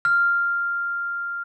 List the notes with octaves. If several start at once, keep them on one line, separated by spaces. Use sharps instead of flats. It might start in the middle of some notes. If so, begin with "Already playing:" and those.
F6